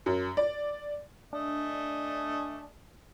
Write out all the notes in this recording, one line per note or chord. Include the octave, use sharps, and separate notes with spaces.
F#2
D5
A3 D4 D#5 G#5